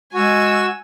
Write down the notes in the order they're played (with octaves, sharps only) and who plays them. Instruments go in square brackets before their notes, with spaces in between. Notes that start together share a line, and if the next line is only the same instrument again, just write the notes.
[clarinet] G#3 [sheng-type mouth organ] F#4 [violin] G#5 E6